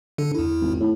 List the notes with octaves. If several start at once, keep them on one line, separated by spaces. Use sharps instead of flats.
D3 D4 A4
E2 E4
G#1
A2